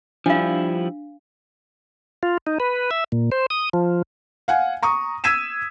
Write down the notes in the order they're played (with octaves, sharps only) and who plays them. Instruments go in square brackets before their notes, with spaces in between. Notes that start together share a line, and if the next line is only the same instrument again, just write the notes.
[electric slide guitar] F3 G3 E4 [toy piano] D4 F5
[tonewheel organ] F4
D#4
B4
E5
A#2
C5
D#6
F3
[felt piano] F5 F#5 G#5
A#5 C#6 D#6
E6 G#6 B6 D#7 E7